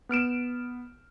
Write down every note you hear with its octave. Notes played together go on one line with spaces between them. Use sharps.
B3 F6 D7 E7